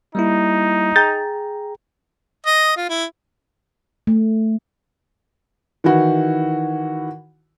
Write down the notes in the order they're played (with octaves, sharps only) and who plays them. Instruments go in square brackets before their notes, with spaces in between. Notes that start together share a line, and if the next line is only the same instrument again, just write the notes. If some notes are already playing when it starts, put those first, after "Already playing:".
[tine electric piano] G3 A#3 E4 [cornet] D#4
[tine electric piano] G#4 G5 A#5 [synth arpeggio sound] G6 A6
[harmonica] D#5
F4
E4
[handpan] A3
[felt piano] D#3 E3 E4 F#4